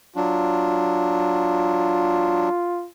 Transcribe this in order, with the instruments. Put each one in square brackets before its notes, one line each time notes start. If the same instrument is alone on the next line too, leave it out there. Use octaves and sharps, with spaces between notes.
[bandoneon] F#3 D4 [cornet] F4